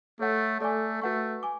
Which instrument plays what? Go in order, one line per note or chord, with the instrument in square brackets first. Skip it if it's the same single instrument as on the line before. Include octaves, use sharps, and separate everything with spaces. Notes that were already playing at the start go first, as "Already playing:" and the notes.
[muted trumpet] A3 [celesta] A4 C#5 F#5
[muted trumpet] A3 [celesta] A4 D5 G#5 D6
[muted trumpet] A3 [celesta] F#4 B4 F#5 C#6
[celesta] G#5 D6